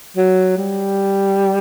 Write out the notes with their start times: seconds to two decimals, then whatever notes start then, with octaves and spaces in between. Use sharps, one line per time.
0.17 F#3
0.57 G3